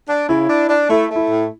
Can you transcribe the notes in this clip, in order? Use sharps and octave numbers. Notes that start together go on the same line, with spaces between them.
D4
C#3 E4
D4
D4
A3 E4
A3
E4
A2